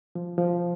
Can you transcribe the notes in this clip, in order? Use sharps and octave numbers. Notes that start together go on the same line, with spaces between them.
F3
F3